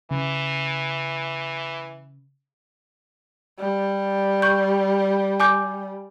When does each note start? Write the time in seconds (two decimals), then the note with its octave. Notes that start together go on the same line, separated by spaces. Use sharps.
0.11 C#3 E3
3.59 G3
4.42 C#6 G6
5.40 G#5 D6 G6